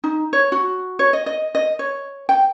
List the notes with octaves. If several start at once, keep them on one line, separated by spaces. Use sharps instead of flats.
D#4
C#5
F#4
C#5
D#5
D#5
D#5
C#5
G5